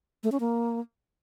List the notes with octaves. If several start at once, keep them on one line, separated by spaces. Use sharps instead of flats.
A3
C#4
A#3